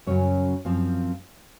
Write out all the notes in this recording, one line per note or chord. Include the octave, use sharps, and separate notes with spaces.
F#2 C#3 F#3 C#4 C#5
F#2 F3 C4 F4 F5